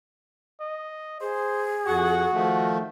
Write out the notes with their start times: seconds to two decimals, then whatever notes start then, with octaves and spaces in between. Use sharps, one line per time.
0.60 D#5
1.21 G#4 C5
1.87 F2 F#4 F#5 C#6
2.34 D#3 F3 A3